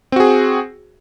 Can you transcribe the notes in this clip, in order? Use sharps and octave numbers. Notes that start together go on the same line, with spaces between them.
C4 F#4 G#4